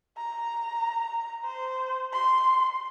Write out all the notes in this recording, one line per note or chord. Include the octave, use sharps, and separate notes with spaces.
A#5
C5
C6